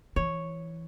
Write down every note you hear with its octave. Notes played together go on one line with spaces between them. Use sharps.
E3 C#5